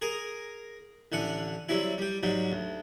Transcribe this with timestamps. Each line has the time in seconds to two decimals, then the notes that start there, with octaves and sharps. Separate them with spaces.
0.02 G#4 A#4 G#5 A#5
1.12 A1 D3 F#5 G#5
1.69 F#3 G3 C4 E4
1.98 G3 G4
2.23 G#2 F#3 G3
2.52 D2